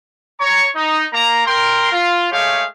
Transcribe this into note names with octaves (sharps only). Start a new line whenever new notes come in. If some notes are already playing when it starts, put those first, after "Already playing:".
C#5 A#5 C#6
D#4
A#3 A#5
A#4 G5 C6
F4
G#3 A3 G4 G#4 C#5 F5